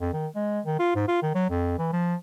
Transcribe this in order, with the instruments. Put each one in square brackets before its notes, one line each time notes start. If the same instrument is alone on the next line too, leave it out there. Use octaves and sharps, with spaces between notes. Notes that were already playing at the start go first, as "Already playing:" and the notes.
[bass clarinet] F2
D#3
G#3
D#3
F4
G#2
F4
D#3
F#3
F2
E3
F3